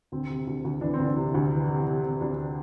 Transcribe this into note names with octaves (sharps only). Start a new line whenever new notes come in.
D2 C4
C3
D2
D2
E3 D4
C4
D2
D4
C3
D2
E3
C3
C3
C3
D2 D4